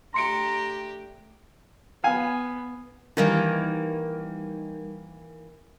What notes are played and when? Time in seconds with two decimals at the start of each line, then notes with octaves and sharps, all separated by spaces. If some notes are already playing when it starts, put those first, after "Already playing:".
0.14 A3 D4 G4 A#5 C6 C#7 D7
2.04 B3 F5 G#5
3.17 D#3 E3 G3 A#3 D#4